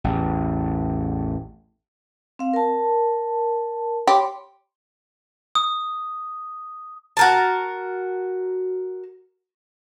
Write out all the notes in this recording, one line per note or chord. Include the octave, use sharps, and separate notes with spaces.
A1 E2
C4 F5
A#4 A5
G4 C#5 B5 C6
D#6
F#4 A#4 A5